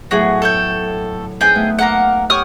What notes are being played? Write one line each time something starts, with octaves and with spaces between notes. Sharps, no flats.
A2 F#3 B3 F#4 G#4
A4 C#5 G5
C4 D#4 G#4 B4 D#5 G5
A3 B3
A#3 A#4 F#5
G4 C#5 F#5 C#6 D#6 F6